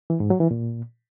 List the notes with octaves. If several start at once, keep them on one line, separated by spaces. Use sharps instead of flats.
E3
G#2
F#3
E3
A#2